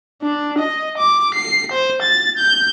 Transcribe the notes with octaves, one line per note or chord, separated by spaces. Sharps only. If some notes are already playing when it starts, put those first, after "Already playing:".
D4
D#5
D6
C7
C5
A6
G6